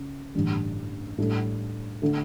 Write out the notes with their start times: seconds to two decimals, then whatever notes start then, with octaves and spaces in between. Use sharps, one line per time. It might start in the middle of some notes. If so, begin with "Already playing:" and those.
Already playing: C#3
0.35 A1 G2 D3 G3 D4
1.18 A2 G3 D4 A4
2.02 D3 A3